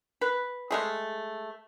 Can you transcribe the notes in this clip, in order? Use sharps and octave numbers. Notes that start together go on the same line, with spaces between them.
B4
G#3 A3 G#4